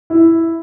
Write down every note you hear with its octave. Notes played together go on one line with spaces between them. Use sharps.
E4